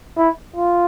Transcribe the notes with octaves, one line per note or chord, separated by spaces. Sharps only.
E4
F4